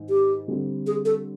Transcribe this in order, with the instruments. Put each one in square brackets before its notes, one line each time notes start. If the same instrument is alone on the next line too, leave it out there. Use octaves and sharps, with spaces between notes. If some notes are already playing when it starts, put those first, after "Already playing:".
Already playing: [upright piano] G#2 D#3
[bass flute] G4
[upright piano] D3 G3 C4
[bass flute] G#4
A4